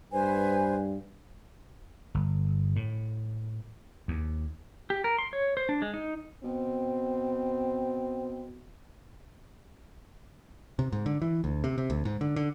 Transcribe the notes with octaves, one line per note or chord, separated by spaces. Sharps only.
G2 B4 C5 G#5
G1
A2
D#2
G4
A#4
C6
C#5
C5
D4
G#3
D#4
B2 C4
C3
G#2
D3
E3
D2
C3
C3
D2
G#2
D3
D3